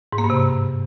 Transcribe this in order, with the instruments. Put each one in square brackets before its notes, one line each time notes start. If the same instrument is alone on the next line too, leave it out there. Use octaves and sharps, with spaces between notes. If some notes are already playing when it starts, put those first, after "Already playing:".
[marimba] G#2
A#3
G2
C3